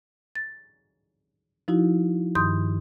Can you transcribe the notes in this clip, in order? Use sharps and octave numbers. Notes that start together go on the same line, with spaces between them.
A6
F3 D#4 E4 F#4
G2 D#3 C6 D#6 G6